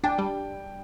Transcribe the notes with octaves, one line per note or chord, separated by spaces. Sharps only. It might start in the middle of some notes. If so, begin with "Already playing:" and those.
D4 G5
G3